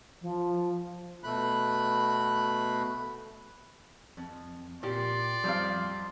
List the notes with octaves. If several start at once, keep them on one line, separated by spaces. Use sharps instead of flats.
F3
B2 A3 B5 F#6
F2
A#2 G4 D5 C6
F2 G3 C4 F5